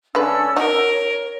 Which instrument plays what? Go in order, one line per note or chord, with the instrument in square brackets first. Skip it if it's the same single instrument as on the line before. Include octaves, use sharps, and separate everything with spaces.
[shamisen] D3 G#3 B4 [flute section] C#4 D4 E6
[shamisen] D#4 F#4 [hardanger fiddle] A#4 [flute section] C#5